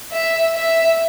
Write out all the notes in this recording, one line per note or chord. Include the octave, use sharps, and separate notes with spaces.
E5
E5